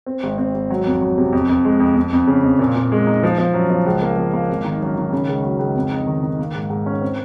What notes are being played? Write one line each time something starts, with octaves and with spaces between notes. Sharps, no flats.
C4
G#1
C4
G#1
F#3
F2
F#3
C3
F2
F2
G#3
F2
F2
F2
C#3
F2
A#2
A#2
G#3
D#4
F3
F3
F#2
F3
C#2
A#3
F3
A#3
G#1
D#3
F#2
D#3
C#3
C#2
F#3
C#2
F2
D#4
D#3
D#3
A#3
G#2
G#2
C#4
C4